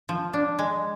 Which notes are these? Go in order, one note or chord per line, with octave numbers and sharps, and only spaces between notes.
F3
D4
G#3